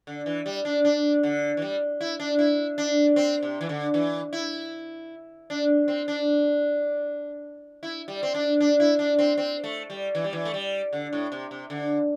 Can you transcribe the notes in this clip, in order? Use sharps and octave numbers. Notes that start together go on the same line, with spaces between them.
D3
E3
G3
D4
D4
D3
E3
G3
E4
D4
E4
D4
C4
C3
E3
D3
E3
E4
D4
C4
D4
E4
G3
C4
D4
D4
E4
D4
C4
C4
A3
G3
E3
G3
E3
A3
G3
D3
A2
C3
C3
D3